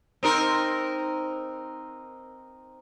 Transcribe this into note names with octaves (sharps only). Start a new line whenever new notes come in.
C4 D#4 A#4